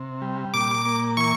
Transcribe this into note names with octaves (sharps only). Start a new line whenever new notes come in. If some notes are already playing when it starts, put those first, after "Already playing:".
Already playing: C3
G3
A#2 D6
A#3
E3 C#6